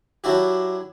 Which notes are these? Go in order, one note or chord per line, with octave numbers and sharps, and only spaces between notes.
F#3 D4 E4 F#4 G4